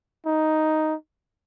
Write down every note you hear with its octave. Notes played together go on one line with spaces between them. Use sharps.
D#4